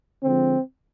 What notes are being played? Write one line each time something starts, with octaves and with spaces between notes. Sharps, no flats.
D3 F3 G#3 C4